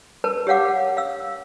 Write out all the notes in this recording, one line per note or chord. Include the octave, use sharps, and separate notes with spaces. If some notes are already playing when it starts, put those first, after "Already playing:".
A#4 B4 A5
G4 C#5 F5 F#5 D6
F5 E6